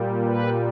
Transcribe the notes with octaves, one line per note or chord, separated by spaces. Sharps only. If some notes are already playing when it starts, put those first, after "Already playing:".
Already playing: A#2 G3
B4